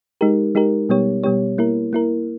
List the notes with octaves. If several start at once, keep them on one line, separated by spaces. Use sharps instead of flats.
G#3 D#4 G4 A#4
G#3 D#4 G4 A#4
B2 G3 B3 G4 C#5
B2 G3 B3 G4 C#5
A#3 E4 A#4
A#3 E4 A#4